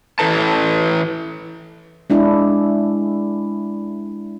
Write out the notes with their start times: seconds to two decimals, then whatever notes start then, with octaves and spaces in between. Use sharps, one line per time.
0.19 E3 E4 A4 B4 A5
2.10 G#3 D4 E4